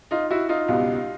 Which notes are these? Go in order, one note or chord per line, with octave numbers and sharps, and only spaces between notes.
D#4 F4
E4 F#4
D#4 F4
C#2 B2 G3